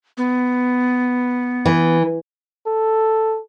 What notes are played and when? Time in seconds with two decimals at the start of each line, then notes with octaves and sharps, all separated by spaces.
0.17 B3
1.65 E3
2.67 A4